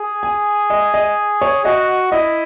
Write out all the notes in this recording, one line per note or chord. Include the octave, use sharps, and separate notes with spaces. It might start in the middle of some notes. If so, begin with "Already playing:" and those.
Already playing: G#4
G#5
D#5
D#5
C#5
F#4 D#5
E4 D#5